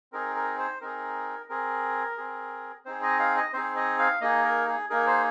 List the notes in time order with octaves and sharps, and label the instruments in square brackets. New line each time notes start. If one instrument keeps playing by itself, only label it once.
[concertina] C4 D#4 G#4 A#4
A#4
C5
C4 D#4 G#4 A#4
C4 G#4 A#4
C4 G#4
C4 D#4 G#4 C5
D#5
F5
D#5
C4 D#4 G#4 C5
D#5
F5
A#3 D#4 G#4 D#5
A#4
G#4
A#3 D#4 G#4 A#4
C5